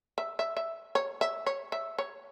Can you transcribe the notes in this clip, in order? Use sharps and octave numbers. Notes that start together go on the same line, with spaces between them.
E5
E5
E5
C#5
E5
C#5
E5
C#5